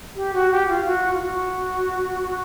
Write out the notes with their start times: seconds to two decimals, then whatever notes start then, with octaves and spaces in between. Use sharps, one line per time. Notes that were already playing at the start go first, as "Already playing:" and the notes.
0.16 G4
0.34 F#4
0.52 G4
0.68 F4
0.86 F#4
1.14 F4
1.22 F#4